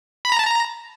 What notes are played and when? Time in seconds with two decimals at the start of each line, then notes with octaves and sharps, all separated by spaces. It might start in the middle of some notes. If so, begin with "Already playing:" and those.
0.25 B5
0.32 A#5
0.39 A5
0.46 A#5